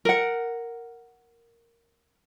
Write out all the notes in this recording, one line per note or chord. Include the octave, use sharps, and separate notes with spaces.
A#4 F#5